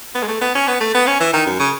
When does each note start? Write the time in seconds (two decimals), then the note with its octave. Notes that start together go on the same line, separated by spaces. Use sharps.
0.15 B3
0.23 G#3
0.28 A3
0.41 B3
0.55 C#4
0.68 B3
0.81 A3
0.95 B3
1.07 C#4
1.20 E3
1.33 D#3
1.46 F#2
1.60 C#3